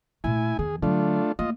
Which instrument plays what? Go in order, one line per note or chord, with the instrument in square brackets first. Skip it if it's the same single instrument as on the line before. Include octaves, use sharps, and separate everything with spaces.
[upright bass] A#2 A3 [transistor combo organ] E4 G#5
[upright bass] E2 D#3 [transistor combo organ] G#4
[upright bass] D3 F#3 [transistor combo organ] A3 D4 F4
[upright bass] A3 A#3 [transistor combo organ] F4 D#5